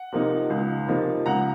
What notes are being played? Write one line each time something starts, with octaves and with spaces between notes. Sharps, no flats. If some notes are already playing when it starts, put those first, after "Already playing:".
Already playing: F#5
C3 F3 A#3 D#4
C#2
C3 F3 A#3 D#4
C#2 F#5 A#5